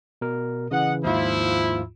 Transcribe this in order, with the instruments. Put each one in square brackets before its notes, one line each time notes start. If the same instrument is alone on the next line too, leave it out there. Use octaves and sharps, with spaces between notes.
[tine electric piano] B2 A#4
[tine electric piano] C#3 E3 [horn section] D#5 F#5
[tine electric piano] D#2 G#2 F4 [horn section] F3 E4